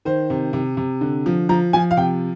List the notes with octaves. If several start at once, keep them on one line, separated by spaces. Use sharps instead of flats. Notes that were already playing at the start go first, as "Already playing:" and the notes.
D#3 C5
C3
C3
C3
D3
F3
F3 A#5
F3 G#5
F5
C3 G5